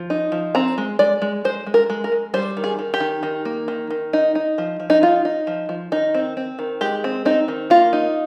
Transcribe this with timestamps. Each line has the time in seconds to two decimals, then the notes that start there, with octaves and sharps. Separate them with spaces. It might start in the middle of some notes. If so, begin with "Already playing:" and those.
Already playing: F3
0.10 D#4
0.32 F3
0.55 C4 A#5
0.78 G#3
0.99 G#3 D5
1.22 G#3
1.45 G#3 C5
1.67 G#3
1.74 A#4
1.90 G#3
2.04 A#4
2.12 G#3
2.34 G3 C5
2.57 D#3
2.64 G#4
2.79 D#3
2.94 G4
3.00 D#3
3.23 D#3
3.45 A#3
3.68 D#3
3.90 D#3
4.13 D#4
4.35 D#4
4.58 F3
4.80 F3
4.90 D#4
5.02 D#4 F4
5.25 D#4
5.47 F3
5.69 F3
5.92 D#3 D#4
6.15 C4
6.37 C4
6.59 D#3
6.81 G#3 G4
7.04 C4
7.25 C4 D#4
7.48 D#3
7.70 A#3 F4
7.93 D#4